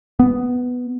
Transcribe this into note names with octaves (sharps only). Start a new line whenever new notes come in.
B3